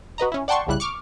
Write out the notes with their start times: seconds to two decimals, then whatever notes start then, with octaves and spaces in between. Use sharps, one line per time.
0.18 F#4 B4 D#5 A#5
0.32 C#4 E4
0.48 D5 F#5 G5 A5 C6 C#6
0.67 G1 C2 C#3 G3 E4 F#6
0.80 C#6 D6 F6